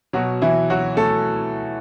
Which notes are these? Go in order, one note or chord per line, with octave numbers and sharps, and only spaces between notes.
B2 F#3 F#4
E3 E4
F#3 F#4
A3 A4